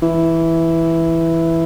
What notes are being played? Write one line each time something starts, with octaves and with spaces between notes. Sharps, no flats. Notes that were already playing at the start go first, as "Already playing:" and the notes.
E3